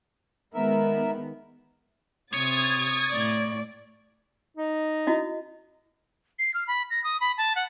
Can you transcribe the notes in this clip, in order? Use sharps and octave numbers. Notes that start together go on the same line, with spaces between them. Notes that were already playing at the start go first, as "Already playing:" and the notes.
D#3 G#3 B3 A#4 E5
C3 C#5 D#6 G#6 A6
A2 D5
D#4
E4 F#4 D#5
C7
F6
B5
A#6
D#6
B5
A5
F#5